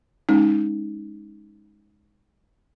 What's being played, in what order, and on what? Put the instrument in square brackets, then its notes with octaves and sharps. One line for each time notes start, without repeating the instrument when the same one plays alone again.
[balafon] G#3 C#4 D#4